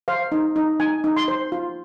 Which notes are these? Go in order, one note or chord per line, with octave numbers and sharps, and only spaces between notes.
C5 F5
D#4
D#4
D#4 G#5
D#4
C6
C5
F4